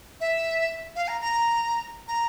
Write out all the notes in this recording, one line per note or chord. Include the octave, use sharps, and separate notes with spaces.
E5
F5
A#5
A#5
A#5